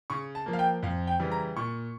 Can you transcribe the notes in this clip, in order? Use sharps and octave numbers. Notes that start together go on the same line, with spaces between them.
C#3 C#6
A5
F3 A#3
F5
G5
F2 F5
G5
C#3 E3 G3
A#5
A#2 C#6